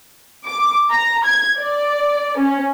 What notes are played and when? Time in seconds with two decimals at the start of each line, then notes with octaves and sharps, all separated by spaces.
0.46 D6
0.92 A#5
1.25 G#6
1.59 D5
2.39 C#4